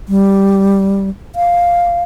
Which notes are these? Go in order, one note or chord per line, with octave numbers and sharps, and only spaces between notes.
G3
F5